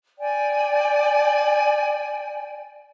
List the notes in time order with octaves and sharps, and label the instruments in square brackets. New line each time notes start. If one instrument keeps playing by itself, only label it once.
[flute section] D5 G5 G#5